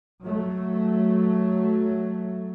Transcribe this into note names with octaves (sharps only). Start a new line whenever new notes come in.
F#3 A3